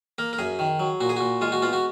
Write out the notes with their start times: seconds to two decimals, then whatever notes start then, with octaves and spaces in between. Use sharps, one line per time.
0.18 A#3 A#4
0.33 A#4
0.38 F#2 G#4
0.59 D#3
0.80 F#3
1.01 A#2 F#4
1.09 G#4
1.17 A#2 F#4
1.41 G#3 F4
1.52 F#4
1.62 B3 F4
1.73 F#4